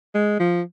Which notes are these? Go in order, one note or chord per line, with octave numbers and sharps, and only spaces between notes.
G#3
F3